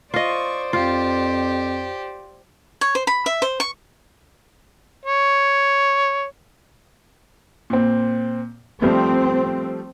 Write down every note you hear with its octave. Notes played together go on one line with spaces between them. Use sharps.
F4 C5 D5 D#5 C#6
F2 F4 G4
C#5
C5
B5
E5
C5
C#6
C#5
A#2 C4
F3 G3 A3 C4